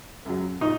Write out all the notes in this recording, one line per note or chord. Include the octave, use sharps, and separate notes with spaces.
F#2 C#3 F#3
A#2 D#4